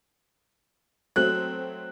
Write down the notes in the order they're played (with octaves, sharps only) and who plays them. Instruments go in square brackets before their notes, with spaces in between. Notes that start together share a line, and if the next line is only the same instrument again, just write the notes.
[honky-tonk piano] F#3 A3 C4 [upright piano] F#6